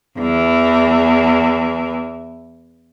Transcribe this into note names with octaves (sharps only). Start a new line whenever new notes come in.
E2 E3